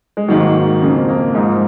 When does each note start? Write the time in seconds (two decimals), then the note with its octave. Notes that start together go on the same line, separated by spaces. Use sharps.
0.17 G#3
0.28 G#2 D#3 F#3 A#3
0.81 F2 C#3 F3 A#3
0.96 C4
1.09 A#3
1.35 G#2 F3 G#3